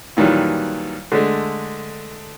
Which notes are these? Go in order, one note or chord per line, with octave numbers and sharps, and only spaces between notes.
A#2 D#3 E3 F#3 G3
D3 G#3 A3